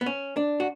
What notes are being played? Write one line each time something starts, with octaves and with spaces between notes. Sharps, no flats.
B3
C#4
D4
F#4